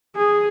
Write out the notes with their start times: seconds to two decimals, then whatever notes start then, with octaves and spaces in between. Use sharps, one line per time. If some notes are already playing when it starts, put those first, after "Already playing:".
0.16 G#4